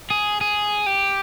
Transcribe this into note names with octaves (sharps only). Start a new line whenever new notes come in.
G#4
G#4
G4